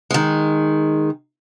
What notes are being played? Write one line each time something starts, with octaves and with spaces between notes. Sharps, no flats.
D#3 G#3